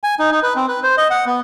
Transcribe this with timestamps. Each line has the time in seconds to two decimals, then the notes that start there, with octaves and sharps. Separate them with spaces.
0.04 G#5
0.19 D#4
0.32 D#4
0.43 B4
0.56 C4
0.68 B4
0.83 C5
0.98 D#5
1.10 F#5
1.26 B3